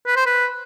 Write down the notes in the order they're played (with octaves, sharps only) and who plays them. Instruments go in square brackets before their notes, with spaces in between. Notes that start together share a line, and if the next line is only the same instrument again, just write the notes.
[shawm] B4
C5
B4